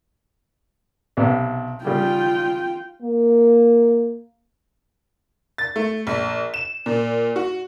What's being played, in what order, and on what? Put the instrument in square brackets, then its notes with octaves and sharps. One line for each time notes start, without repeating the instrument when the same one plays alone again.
[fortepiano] B1 C3 B3
[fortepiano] C#3 G3 [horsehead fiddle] F4 G5
[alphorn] A#3
[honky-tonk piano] A6
A3
A#1
E7
A#2
F#4